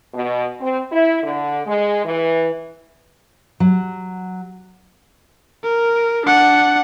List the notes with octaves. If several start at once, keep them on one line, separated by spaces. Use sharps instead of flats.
B2
C4
E4
D3
G#3
E3
F#3
A#4
D4 F#5